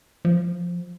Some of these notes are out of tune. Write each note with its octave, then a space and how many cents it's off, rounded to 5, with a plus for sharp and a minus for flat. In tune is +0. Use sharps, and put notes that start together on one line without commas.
F3 +5